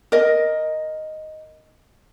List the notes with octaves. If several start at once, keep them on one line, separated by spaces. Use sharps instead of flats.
A#4 D#5